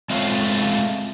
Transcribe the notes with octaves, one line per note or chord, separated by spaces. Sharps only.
G#3 A3 C4 F4 C#5 F5